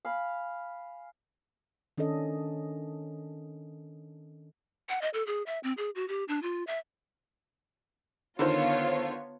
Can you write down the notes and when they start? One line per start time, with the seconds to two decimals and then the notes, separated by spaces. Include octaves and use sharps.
0.05 F5 G#5 B5
1.98 D#3 C#4 D4 A4 D#5
4.89 F#5
5.02 D#5
5.14 A4
5.27 G#4
5.46 E5
5.63 C4
5.77 G#4
5.95 F#4
6.08 G4
6.28 D4
6.42 F4
6.67 E5
8.39 D3 D#3 B3 F4 C5 C#5